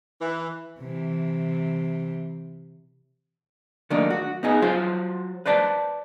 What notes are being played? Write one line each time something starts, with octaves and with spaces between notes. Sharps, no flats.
E3
C3 E3
D#3 F#3 A3 A#3 D4 D#4
F#4
B3 D#4 G#4
F#3 F4 F#4 C5
B4 C5 D5 A5